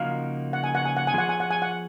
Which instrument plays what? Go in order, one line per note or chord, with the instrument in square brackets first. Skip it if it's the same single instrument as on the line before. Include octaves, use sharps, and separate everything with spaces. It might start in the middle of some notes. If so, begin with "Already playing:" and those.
Already playing: [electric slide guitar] C#3 F3 A#3 D#4 F#4 [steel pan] F5
[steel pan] F#5
G#5
F#5
G#5
F#5
G#5
[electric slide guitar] F3 B3 F4 G#4 [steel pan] F#5
[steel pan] G#5
F#5
G#5
F#5